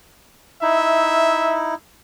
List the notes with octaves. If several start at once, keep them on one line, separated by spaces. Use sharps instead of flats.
D#4 E4 E5